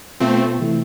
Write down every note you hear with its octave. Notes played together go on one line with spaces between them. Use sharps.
B2 A3 B3 C4 F4
C3 E3 A3 E4